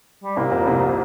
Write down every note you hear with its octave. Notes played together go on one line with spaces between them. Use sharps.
G3
C2 C3 A#3
F2
C2 C3